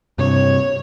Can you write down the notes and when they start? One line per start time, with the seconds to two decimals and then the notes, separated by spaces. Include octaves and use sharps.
0.18 G2 C3 C#5